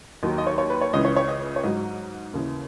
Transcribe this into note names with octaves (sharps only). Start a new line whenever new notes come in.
D#2 D#3 F#3 D#5
D#5
C#5
C#5
B4
C#5
C#2 C#3 E3 D#5
C#5
C#5
D#5
C#5
G#2 F#3 D#5
D#2 C#3 E3